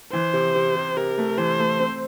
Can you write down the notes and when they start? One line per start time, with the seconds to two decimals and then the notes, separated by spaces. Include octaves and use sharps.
0.12 E3 C5
0.33 C3
0.55 C3
0.76 C3
0.97 C3 A#4
1.18 A3
1.38 E3 C5
1.59 A3
1.80 C4